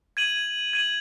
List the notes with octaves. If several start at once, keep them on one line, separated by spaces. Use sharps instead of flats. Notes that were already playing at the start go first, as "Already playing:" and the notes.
G#6 D#7 F#7
G#6 D#7 F#7